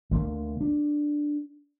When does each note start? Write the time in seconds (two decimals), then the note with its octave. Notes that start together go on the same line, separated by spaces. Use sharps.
0.11 D2 D3 A#3
0.61 D4